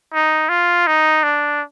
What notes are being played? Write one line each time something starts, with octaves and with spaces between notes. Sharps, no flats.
D#4
F4
D#4
D4